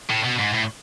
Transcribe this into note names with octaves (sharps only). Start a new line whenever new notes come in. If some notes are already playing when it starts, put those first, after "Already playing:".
A2
B2
G#2
A2